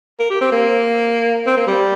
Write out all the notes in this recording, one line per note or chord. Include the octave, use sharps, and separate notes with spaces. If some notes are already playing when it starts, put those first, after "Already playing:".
A#4
G4
C4
A#3
C4
A#3
G3